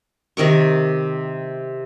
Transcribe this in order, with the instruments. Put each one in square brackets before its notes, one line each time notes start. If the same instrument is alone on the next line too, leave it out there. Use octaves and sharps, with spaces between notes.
[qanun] C3 D#3 A#4 C#6